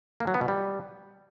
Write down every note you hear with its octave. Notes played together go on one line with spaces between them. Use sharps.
A#3
F#3
B3
B2
G3